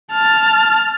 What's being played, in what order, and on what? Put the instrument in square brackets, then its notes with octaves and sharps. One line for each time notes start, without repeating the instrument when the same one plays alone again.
[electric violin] A5 F6